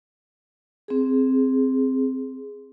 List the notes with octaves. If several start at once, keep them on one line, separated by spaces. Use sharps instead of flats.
C4 G#4